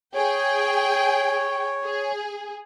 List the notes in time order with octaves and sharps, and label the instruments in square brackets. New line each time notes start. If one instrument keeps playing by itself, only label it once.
[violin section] G#4 G5 [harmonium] C#5
[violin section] G#4